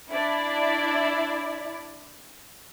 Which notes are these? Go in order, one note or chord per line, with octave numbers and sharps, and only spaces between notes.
D4 E4 D5